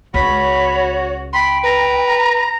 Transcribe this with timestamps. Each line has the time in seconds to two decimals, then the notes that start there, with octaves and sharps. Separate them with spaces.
0.14 C#2 F#4 C#5 B5
1.33 G5 B5 C6
1.64 B4 A#5